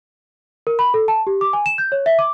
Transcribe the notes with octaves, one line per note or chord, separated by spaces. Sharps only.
A#4
B5
A4
A5
G4
D6
G#5
E7
G6
C#5
E5
D6